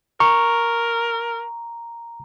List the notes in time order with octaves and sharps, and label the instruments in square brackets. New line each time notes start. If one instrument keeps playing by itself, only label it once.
[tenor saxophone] A#4 [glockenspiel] A#5 [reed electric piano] C#6